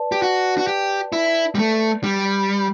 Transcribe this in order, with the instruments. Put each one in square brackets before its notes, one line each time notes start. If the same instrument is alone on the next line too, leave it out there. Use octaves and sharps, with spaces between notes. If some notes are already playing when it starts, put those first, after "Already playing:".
Already playing: [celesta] B4 D5 A5
[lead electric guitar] G4
F#4
F#4
G4
E4
G3
A3
G3